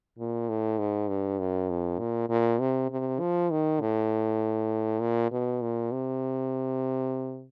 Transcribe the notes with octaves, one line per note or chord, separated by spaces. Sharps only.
A#2
A2
G#2
G2
F#2
F2
A#2
A#2
C3
C3
F3
D#3
A2
A#2
B2
A#2
C3